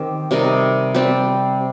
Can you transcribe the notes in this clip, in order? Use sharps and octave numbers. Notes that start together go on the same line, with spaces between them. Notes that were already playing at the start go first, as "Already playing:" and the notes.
Already playing: D#3 C4 G4
C3 G3 D#4 A#4
G3 C4 G4